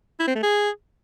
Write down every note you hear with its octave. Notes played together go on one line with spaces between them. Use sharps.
E4
C4
A3
G#4